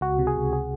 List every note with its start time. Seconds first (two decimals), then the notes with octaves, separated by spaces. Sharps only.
0.01 C#2 F#4
0.19 C3
0.27 G#4
0.36 C#2
0.53 G#4